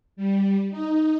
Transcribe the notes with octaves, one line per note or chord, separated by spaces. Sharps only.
G3
D#4